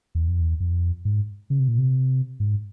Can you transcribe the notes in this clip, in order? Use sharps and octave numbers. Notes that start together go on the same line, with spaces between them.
E2
F2
E2
F2
G#2
C#3
C3
A#2
C3
G#2